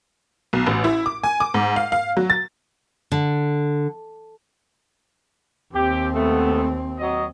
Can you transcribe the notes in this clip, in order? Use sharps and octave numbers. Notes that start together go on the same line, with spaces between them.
B1
A1
E4
D6
G#5
D6
G#2
F5
F5
F#3
A6
D3
D#2 C4 G4
A3 B3
F#3 D#5